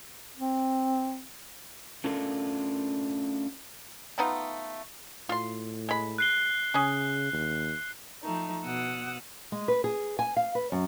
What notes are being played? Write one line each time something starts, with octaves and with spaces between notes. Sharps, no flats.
C4
A3 C#4 D4 F4 A4 A#4
A3 B3 D#4 F4
A2 F4 C6
G#3 B5
F#6 C7 G7
C#3 C#4 G#4
D#2
F3 A3 D#4
B2 F#5 D#6 E6
G#3
B4
G#4
G#5
F5
B4
F#2